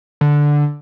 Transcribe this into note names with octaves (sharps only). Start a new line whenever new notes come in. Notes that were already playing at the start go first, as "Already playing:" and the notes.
D3